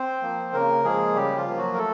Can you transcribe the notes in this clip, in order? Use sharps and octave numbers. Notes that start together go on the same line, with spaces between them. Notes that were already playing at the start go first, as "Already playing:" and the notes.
Already playing: C4 C5
F3 A#3
C#3 A#3 A#4
F3 G#3 A#3 G#4
C#3 G3 G4
F3 F4
F3 A#3
F#3 F#4
A#4
A3 A4